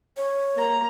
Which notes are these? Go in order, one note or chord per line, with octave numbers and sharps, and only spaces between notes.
C#5
A#3 A#5